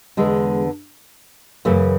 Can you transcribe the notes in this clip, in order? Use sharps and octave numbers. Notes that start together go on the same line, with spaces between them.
E2 D3 G#3
F#2 C#3 E3 A3